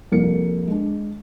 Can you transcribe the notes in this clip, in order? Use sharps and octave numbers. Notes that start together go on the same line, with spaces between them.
C2 F2 A#3 A#4 C#7
G#3 D4